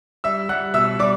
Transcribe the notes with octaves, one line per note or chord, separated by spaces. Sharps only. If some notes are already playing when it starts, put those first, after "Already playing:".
G3 E5 E6
G3 F#5 F#6
B2 E5 E6
G3 D5 D6